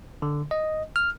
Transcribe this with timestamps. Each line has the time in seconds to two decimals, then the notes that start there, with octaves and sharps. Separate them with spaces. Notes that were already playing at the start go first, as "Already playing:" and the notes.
0.22 D3
0.51 D#5
0.96 F6